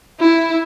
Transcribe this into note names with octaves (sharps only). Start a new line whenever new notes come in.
E4